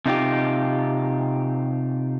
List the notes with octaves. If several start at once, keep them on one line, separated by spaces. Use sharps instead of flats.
C3 D#4 F4 G4